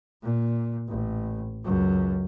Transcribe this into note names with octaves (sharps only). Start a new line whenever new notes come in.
A#2
A1
C#2 F#2